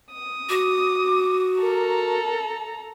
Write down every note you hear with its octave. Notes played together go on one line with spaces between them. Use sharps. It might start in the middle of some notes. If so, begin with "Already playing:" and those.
D#6
F#4 D6
A4 A#4 A#5